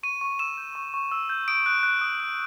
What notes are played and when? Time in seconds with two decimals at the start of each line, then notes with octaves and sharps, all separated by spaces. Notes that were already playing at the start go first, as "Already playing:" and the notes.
0.03 C#6 D#7
0.21 C#6
0.39 E6 E7
0.58 G6
0.75 C#6
0.94 C#6
1.12 E6
1.29 G6
1.48 D#6 D7
1.66 F#6
1.83 F#6
2.01 D#6
2.20 D#6